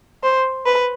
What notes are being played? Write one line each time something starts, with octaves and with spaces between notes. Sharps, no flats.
C5
B4